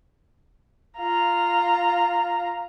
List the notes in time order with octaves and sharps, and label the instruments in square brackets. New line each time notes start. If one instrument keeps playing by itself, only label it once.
[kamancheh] F4 A#5